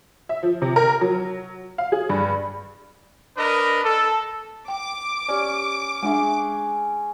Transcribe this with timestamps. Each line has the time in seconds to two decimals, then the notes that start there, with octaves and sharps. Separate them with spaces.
0.29 E5
0.43 F3
0.62 C3
0.76 A#4
1.01 F#3
1.78 F5
1.92 G#4
2.09 G2
3.36 D4 A#4 B4 D#5
3.84 A4
4.68 G5 D6
5.28 C#4 G4 D5
6.03 G#3 D4 G#4 E5 F#5 G#5